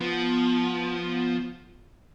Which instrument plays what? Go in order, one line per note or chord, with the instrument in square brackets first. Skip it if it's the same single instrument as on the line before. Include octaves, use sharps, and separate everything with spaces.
[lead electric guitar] F3 [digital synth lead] B3